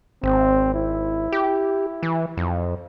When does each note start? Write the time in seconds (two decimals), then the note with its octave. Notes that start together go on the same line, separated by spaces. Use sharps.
0.23 G#1 C4
0.74 E4
1.32 G4
2.03 E3
2.37 F2